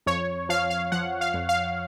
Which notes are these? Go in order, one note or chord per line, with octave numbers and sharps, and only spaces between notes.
F2 C#5
F3 F5
F5
F3 F#5
F5
F2
F5